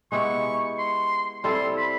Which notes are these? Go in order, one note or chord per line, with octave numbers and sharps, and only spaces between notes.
G#3 B3 E4 G4 C#6
C6
G3 C4 E4 A4 C6
B5